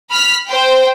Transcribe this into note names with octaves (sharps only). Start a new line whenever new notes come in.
B5 F6 B6
C5 G5